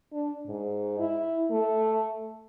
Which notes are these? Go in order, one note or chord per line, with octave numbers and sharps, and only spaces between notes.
D4
G#2
E4
A3